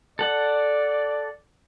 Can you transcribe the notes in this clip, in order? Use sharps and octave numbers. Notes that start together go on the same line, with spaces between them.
A4 D5 F#5